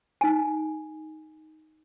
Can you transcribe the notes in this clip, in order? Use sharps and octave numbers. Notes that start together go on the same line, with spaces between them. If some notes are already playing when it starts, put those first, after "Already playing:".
D#4 G#5